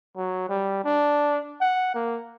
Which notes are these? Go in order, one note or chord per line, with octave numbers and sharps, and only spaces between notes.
F#3
G3
D4
F#5
A#3